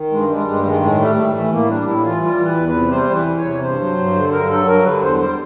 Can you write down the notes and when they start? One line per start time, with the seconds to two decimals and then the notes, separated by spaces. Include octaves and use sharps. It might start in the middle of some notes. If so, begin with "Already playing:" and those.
Already playing: D#3
0.11 G2 G#3
0.29 G3 G#3
0.47 G2 G#3
0.59 A3
0.64 D#3 G#3
0.81 A2 G#3
0.99 G3 A3
1.16 A2 A3
1.34 E3 A3
1.52 A2 A#3
1.69 G3 D4
1.87 A2 E4
2.04 E3 F4
2.22 G3 F4
2.39 E3
2.45 B4
2.57 E2
2.69 B4
2.75 C3
2.91 G3 C5
3.10 E3
3.16 B4
3.27 E2
3.38 C#5
3.45 C3
3.62 G2 C5
3.80 F#3
3.98 G2
4.15 D3
4.32 G2 A#4
4.49 F#3 A4
4.67 G2 A#4
4.84 D3 B4
5.02 E2 C5
5.20 G3